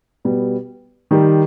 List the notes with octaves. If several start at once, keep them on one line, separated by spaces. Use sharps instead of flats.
B2 G3 B3
D#3 G3 D#4 G4